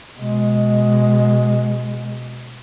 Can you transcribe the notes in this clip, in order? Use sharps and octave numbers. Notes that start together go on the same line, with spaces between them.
B2 G#3